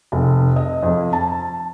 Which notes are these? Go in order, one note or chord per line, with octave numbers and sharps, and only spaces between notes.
F1
D#5
F2
A5